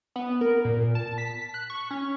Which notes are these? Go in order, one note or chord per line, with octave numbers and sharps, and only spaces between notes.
B3
A#4
A#2
A5
B6
F#6
C#6
C#4